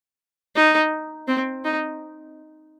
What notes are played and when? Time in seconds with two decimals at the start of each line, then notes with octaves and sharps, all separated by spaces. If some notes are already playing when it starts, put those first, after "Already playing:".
0.56 D#4
1.28 C4
1.64 D#4